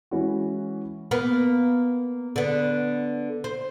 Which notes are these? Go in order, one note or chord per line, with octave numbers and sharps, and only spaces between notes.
E3 G#3 C#4 E4 F#4
A#3 B3
D3 B3
C5